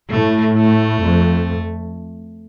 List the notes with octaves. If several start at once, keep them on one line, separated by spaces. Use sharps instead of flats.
A2 A3
A3
F2